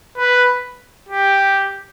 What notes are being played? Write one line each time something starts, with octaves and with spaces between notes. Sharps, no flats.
B4
G4